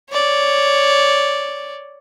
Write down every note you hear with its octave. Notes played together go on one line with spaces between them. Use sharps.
C#5 D5